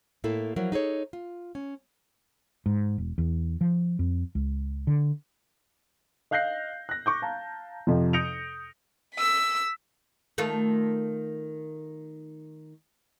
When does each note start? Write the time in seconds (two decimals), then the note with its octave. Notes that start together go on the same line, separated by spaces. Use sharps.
0.24 A2 A#3 E4 A4
0.56 F3 F#3 E4 A#4
0.72 D#4 G#4 A4 C#5
1.13 F4
1.55 C#4
2.66 G#2
2.98 E1
3.18 E2
3.61 F3
3.99 F2
4.35 C#2
4.87 D3
6.31 D#5 F5 F#6 G6 A#6 C7
6.89 F#6 A#6
7.06 C#6 D6 G6
7.22 F5 A5 A#5
7.87 F2 C3 F3
8.13 D#6 G6 A#6 C#7 D7 F7
9.15 E6 B6
10.38 D#3 A3 F4